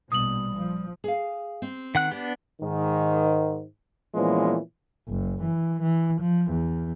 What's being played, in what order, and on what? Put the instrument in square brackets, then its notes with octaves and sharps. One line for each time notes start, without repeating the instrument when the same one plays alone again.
[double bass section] A#1 B2 [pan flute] G3 [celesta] D#6 F#7
[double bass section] F3
[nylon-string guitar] G#4 F5
C4
[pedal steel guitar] D#3 F#5 F#6
[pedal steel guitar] B3 D4 [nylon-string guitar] G4
[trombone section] G#2 D#3
A#2 E3 F3 G#3 B3 C#4
[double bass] F#1
E3
E3
F3
E2